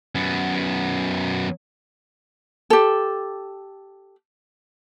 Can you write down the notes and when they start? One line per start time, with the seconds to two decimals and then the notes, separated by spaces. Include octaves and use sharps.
0.15 F#2 B3
2.70 G4 A4